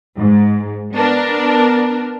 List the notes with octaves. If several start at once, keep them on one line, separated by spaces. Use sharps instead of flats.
G#2
B3 D4 A#4